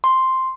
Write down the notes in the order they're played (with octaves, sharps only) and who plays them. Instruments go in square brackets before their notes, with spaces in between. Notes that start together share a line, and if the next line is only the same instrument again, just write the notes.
[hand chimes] C6